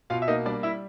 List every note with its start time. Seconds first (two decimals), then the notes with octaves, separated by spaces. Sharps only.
0.10 B2 F4 F5
0.22 E5
0.28 A#3 D#4 D#5
0.46 G3 D4 D5
0.63 E4 E5